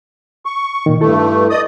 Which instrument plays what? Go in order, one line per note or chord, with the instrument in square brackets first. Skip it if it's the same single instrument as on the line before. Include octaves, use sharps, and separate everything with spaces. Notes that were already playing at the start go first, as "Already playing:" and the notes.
[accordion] C#6
[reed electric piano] A#2 D#3
[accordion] G2 A3 [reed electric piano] E4 A4
[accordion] D5 D#5 D#6